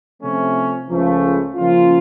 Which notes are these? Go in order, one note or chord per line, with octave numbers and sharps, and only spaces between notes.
C3 F3 A3 C#4
C#2 C#3 F3 A3
C#3 F3 A#3 C#4 F4